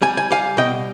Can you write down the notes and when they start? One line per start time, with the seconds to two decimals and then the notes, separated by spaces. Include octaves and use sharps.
0.02 G3 G#5
0.17 G#5
0.31 G3 F5 G#5
0.57 B2 D#5 G5